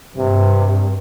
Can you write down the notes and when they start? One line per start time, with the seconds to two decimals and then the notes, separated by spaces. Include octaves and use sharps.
0.18 G2 C3